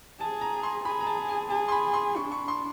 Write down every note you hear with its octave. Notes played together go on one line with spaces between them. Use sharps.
G#4 A5
A#5
C6
G#4 B5
A#5
A5
G#5
G#4 A5
C6
B5
C6
D4 C#6
C#6
C6